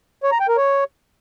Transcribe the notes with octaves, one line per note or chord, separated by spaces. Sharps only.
C#5
A#5
G5
A#4
C#5